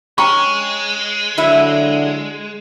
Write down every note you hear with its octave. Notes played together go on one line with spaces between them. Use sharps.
G#3 C#4 G5 A#5 C#6
D3 F#3 E4 E5